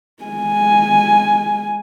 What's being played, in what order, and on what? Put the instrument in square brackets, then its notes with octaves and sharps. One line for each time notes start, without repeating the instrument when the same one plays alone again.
[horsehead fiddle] G#3 G#5